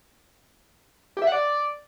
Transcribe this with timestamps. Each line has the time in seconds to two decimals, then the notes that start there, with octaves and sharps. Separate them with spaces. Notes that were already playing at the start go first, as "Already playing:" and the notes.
1.17 G4
1.22 E5
1.27 F#5
1.32 D5